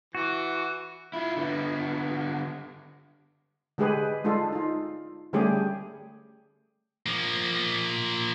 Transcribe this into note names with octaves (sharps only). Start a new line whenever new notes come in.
E3 F#4
E4 F4
D3 B3
D3 G#3 G4 G#4 B4
G#3 D4 F4 A4
D#4 F4
D3 G3 A3 C#4 G4 G#4
F3 A#3